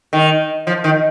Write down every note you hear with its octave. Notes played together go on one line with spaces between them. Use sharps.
D#3
F3
D#3